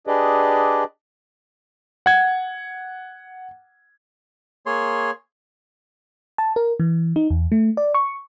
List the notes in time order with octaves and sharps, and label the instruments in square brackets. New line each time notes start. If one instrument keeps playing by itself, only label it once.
[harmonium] D4 G4 G#4 B4 D5 D#5
[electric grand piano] F#5 G#6
[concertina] A#3 G#4 C#5 C6
[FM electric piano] A5
A#4
E3
D#4
E2
A3
D5
C#6